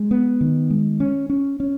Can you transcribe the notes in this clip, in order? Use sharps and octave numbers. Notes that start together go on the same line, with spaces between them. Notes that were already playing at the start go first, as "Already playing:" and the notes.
Already playing: G#3
B3
D#3
G#3
C#4
C#4
C#4